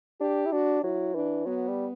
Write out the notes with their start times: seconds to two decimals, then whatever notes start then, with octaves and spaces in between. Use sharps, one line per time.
0.20 D4 G4
0.46 E4
0.52 D4 F#4
0.83 F#3 E4
1.15 E3 D4
1.46 F#3 B3
1.67 G3